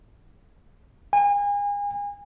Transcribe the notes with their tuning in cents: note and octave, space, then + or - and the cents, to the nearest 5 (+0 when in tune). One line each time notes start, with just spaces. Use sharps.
G#5 -35